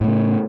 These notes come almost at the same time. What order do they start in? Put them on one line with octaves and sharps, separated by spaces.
A2 A3 C#3